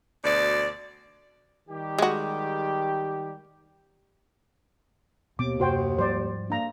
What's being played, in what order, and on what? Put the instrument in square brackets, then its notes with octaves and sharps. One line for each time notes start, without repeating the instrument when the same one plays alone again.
[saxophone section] D2 B2 D5
[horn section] D#3 G3 G4
[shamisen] G#3 F#4
[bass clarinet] D#2 [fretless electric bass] B2 B3 C4 [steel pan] D6
[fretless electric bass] F#2 C3 [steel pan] F#4 C5 G5
[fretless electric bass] G#2 F3 G3 [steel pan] C5 D5
[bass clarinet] A#3 [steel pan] D4 A#5